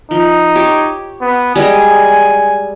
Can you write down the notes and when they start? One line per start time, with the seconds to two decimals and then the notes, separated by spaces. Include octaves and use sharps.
0.11 F3 D#4
0.55 G4 C#5
1.21 B3
1.56 G3 G#3 G#4 G#5